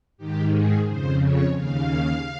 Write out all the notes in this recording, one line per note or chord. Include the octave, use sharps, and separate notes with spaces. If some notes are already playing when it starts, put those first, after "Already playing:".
G#2 D#3 G4
G#4
F2 C#3 C5
C#5
D#2 C#3 F5